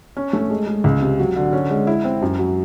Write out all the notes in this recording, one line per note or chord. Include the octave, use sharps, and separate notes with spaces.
C#4
A3
G#3
G#3
C#2
C3
F#3
D3
C#4
G#3
E4
C4
F#2
F#3